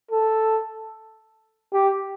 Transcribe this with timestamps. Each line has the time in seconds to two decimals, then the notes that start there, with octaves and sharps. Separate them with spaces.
0.11 A4
1.73 G4